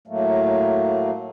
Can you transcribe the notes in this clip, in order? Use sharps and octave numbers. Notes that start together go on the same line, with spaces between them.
A2 F#3 A3 A#3